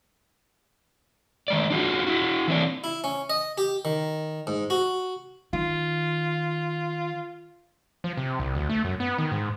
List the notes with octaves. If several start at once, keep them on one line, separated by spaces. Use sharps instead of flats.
D#3 G#3 D5
D4 F4 F#4
E4 F#4
E3 C4 D4
E4
C#4
D#5
G4
D#3
G#2
F#4
D#3 F4
F3
C3
C2
D2
A3
F#2
B3
D#3
G#2